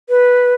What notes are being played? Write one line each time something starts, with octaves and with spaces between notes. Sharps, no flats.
B4